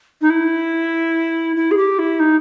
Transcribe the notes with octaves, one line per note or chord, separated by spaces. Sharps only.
D#4
E4
E4
G#4
G4
E4
D#4